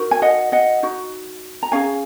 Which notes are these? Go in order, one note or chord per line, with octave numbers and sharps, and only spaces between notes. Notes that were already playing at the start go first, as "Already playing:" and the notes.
Already playing: D#4 F#4 A#4
G#5
D#5 F#5
D#5 F#5
D#4 F#4
A#5
C#4 G#4 F5 G#5